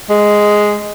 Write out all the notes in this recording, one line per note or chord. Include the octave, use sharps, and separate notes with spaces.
G#3